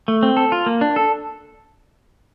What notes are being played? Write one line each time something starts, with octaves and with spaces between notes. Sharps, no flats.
A3
C4
A4
F4
A#3
D4
A4